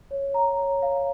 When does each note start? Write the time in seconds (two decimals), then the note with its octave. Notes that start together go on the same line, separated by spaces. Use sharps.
0.11 C#5
0.34 F5 A#5
0.59 C#5
0.82 F5 A#5